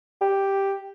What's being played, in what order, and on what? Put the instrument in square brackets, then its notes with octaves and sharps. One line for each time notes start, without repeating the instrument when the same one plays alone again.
[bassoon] G4